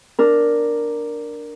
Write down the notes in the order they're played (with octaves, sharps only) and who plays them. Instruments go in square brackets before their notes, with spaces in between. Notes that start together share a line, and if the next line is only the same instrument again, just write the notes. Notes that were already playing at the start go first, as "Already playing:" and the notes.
[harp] D4 A#4